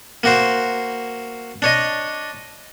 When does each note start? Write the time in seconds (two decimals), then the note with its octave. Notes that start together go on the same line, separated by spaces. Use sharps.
0.23 A#3 F#4 C5
1.62 D4 C#5 D#5